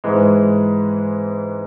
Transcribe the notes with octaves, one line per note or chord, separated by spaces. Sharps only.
G#2 E3 G#3